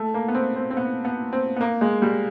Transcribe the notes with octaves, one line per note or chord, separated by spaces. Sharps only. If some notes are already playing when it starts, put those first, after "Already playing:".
Already playing: A3
A#3
B3
C4
C4
C4
B3
B3
C4
B3
A#3
G#3
G3